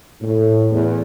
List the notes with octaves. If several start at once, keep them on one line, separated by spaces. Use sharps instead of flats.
A2
E2